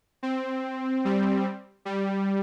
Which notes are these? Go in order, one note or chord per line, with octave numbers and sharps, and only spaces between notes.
C4
G3
G3